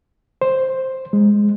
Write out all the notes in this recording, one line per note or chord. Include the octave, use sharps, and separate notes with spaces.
C5
G#3